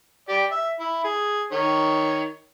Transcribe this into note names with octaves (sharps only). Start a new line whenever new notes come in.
G4 D5
E5
E4
G#4
D#3 C#5